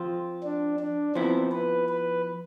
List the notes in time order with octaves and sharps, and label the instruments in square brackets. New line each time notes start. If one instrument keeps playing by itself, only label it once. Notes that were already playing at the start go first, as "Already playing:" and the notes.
Already playing: [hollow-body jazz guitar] F3 C4 F4
[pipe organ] D4
D4
[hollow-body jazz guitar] F3 B3 E4 [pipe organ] C4
[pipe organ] B4
B4